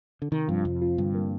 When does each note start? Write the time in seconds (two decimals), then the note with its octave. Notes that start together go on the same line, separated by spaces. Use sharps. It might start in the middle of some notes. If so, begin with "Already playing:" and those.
0.22 D3
0.32 C3 D#3
0.48 G2 F3 C4 F4
0.65 F2 C3
0.82 F3 C4 F4
0.98 G2 D3
1.14 G3 A#3